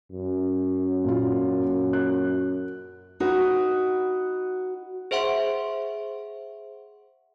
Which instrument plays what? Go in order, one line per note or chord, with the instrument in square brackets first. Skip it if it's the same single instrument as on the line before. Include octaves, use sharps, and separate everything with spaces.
[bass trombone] F#2
[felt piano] A#2 F4
F#6
[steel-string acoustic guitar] D#4 F#4 B4
[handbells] G#4 C5 E5 F#5 C6